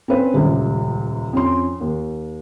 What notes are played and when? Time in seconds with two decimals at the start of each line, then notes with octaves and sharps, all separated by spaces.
0.08 C4 C#4 B4 C5
0.34 D#1 C#2 F#2
1.33 F2 C#4 C6
1.80 D#2